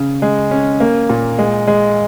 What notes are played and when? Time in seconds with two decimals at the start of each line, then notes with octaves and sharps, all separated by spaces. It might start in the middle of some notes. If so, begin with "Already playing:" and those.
Already playing: C#3
0.22 G#3
0.51 C#4
0.80 A#3
1.10 A#2
1.38 G#3
1.67 G#3